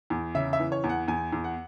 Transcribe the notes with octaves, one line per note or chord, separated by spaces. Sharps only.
E2
C#3 E5
E5
E3
C#5
E2
F#5
E2 G#5
E2
F#5